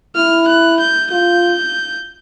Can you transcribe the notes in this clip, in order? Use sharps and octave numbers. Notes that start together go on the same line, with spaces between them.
E4 F6
F#6
G6
F4 G6